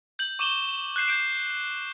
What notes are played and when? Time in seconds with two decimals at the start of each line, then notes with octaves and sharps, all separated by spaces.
0.19 G6 F#7
0.39 C#6 D6 D#7 E7 F#7 G7
0.96 F#6 G6 C7 E7
1.08 G6 D7